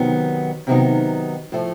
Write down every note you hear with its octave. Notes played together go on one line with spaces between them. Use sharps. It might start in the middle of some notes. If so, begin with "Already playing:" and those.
Already playing: C3 D#3 F#3 B3 D#4
C3 D#3 F#3 B3 D#4
A2 F3 A3